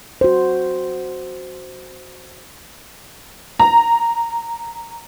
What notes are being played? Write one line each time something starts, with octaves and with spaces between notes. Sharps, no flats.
F#4 C5
A#5